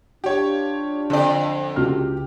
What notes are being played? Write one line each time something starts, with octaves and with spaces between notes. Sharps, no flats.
D4 F4 G4 C#5
F2 D3 D5
C#2 F#4 G4 F6